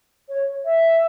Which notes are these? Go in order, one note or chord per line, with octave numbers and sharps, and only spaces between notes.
C#5
E5